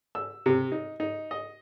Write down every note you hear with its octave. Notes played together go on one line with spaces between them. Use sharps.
E6
C3
D#4
D#4
D#5